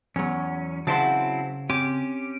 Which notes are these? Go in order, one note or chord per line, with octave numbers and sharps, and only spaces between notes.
E2 F#3 C#4
C#3 F#3 C4 E4 F#4 C5 A5
C4 C#4 G4 D6